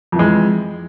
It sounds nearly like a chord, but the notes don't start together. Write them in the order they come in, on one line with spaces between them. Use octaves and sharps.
F2 E3 G#3